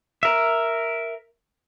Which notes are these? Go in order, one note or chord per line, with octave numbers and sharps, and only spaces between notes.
A#4 E5